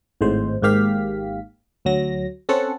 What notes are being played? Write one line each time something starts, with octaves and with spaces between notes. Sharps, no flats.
G#1 A2 G#3 C5
G#1 G#2 A#3 G4 F5 B6
D2 F#3 A#6
C4 C#4 A4 F#5